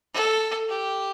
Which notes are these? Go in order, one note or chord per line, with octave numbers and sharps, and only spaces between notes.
A4
G4